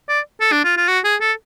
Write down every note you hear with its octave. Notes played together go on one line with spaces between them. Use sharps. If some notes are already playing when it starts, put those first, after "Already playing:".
D5
A4
D4
F4
F4
F#4
G#4
A4